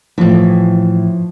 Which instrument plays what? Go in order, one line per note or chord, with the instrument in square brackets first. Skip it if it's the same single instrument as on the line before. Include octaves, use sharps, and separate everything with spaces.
[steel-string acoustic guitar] A2 E3 [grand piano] F3